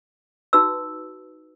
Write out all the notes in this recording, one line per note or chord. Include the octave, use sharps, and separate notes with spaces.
D#4 F#4 B4 E6